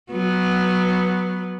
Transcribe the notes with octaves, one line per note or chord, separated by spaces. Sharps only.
F#3 B3